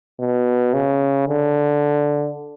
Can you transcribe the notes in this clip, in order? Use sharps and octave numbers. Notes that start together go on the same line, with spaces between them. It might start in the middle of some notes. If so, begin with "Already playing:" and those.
B2
C#3
D3